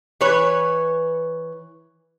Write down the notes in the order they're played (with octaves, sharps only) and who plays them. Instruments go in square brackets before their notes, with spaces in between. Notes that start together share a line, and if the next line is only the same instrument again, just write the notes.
[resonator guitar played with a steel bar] E3 B4 C#5